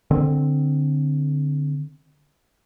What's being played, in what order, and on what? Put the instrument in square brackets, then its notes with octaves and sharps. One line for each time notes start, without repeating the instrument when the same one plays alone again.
[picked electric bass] D3 C4